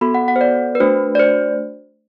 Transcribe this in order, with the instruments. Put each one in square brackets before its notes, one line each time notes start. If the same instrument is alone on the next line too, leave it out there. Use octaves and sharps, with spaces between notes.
[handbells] B3 F#4 A4 B5
F#5
F#5
C5
D5
B4
A3 D4 F#4 C5
D5
C5